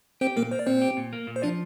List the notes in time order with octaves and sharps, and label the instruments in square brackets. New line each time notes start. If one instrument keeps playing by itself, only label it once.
[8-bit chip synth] C4 C5 [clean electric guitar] G4
[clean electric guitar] A#2 [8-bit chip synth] A#3 A#4
[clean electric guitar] A#3 [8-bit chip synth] C5
[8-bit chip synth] D5
[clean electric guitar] A#2 [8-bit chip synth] C4 C5
[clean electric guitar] G4
A#2
A#3
A#2
[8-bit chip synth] C5
[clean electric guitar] F3 [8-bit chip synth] D4 D5